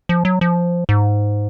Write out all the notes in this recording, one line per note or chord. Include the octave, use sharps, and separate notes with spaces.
F3
F#3
F3
G#2